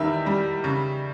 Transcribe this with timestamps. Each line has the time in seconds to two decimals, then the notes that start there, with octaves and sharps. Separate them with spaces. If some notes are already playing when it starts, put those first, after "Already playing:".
Already playing: E2 D#3 G3 E5
0.26 G3
0.64 C#3